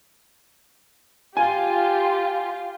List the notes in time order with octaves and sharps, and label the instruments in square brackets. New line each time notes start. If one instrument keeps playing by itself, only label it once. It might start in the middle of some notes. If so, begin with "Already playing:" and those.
[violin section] F4 [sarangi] G4 [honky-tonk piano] G#5